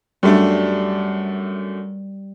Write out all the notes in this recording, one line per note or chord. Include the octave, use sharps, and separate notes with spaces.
F#2 G3 A3 D4